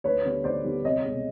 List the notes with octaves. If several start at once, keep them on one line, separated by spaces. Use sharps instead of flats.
D2 B4 C#5
D3 G3 B3
D2 C5 D5
D3 G3 B3
C2 C#5 D#5
B2 G#3